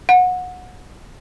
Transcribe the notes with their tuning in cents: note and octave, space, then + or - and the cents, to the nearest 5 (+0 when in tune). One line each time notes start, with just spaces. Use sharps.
F#5 -25